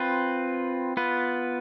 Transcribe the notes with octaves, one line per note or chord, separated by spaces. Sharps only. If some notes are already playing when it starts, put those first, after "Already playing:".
Already playing: C4 F4 B4
B3 F4 B4